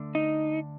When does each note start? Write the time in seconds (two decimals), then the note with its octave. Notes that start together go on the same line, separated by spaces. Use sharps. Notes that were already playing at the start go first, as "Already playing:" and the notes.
Already playing: D2 D3 A3 D4
0.15 D#4